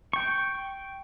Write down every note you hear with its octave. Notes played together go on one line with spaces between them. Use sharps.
G5 C#6